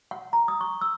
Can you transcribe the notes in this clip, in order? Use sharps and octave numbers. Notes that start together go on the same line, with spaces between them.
F#5
A#5
D#6
C#6
E6